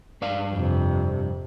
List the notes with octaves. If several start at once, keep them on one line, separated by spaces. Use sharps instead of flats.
G2 D5 F5
F2 C3